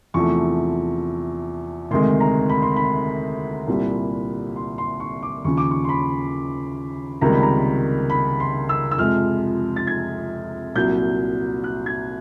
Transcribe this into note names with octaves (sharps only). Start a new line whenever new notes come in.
E2 C3 F3 A3 C#6
D2 C3 D#3 G#3 C6
A#5
B5
C6
B5
C2 A#2 G3
C6
C6
C#6
D6
D#2 C#3 F3 C#6
D6
C#6
C6
B5
C#2 C3 D#3 G3 A#3 A#5
B5
A#5
B5
C6
E6
E6
F2 C3 F3 G#3 F6
A6
G#6
C2 A#2 F#3 G6
F#6
G#6